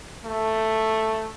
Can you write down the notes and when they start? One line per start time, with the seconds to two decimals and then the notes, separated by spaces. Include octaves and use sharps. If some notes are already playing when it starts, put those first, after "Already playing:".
0.24 A3